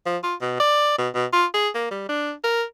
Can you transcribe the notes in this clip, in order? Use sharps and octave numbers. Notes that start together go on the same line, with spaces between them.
F3
F4
B2
D5
B2
B2
F4
G#4
A#3
G3
D4
A#4